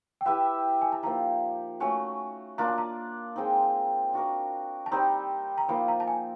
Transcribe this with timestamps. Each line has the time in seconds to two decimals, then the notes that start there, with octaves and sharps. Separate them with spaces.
0.21 G5
0.25 E4 G4 B4 E5 F#5
0.82 G#5
0.92 A5
1.03 F3 A#3 D#4 A#5
1.80 A3 C#4 F#4 G#5
2.58 A#3 D4 F4 A#5
2.68 A5
2.78 A#5
3.36 G#3 C4 D#4
4.13 D4 F#4 A#4
4.86 A5
4.91 G3 C4 D#4 A#5
5.58 A#5
5.69 F3 A#3 D#4 B5
5.88 A#5
6.00 A5
6.07 G#5